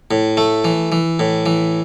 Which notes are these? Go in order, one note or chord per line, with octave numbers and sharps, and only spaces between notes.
A2
A3
E3
E3
A2
E3